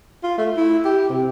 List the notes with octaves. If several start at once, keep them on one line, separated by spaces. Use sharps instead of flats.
F4
A3
E4
G4
C3